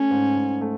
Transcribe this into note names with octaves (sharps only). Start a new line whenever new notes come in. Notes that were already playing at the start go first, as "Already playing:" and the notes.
Already playing: A3 C#4
G#2
G#2
A3